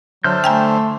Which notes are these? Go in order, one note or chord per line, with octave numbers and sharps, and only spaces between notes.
D3 F#3 C5 E5 A5 F6 G6
A3 G5 G#5 A#5